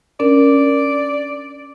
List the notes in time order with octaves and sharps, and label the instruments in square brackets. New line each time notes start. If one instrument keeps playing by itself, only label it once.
[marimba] C#4 D4 A#4 [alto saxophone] D5